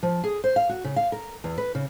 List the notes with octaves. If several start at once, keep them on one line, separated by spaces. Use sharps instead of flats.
F3
G#4
C5
F5
F#4
C#3
F5
A#4
E2
B4
C#3